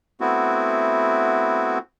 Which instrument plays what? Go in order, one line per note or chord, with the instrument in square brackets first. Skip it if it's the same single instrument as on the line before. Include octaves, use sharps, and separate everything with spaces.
[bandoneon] A3 B3 C4 E4 F#4